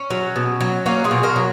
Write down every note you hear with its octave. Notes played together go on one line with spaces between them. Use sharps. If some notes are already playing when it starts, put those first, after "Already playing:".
Already playing: C#4
F#3
B2
F#3
F#3 A#3 C#4
F4 G#4
B2
F#4 A#4
F#3